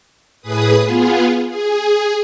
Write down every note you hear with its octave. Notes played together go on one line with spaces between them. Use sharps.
A2 G#4 B4 D#6
B3 F4 G#4
G#4